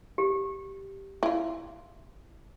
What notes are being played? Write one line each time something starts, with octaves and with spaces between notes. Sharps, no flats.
G4
E4 F4